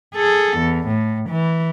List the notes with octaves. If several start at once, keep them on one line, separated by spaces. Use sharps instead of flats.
G#4 A4
E2
A2
E3